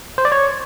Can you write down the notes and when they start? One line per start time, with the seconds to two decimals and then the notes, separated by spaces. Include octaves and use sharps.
0.18 C5
0.25 D5
0.32 C#5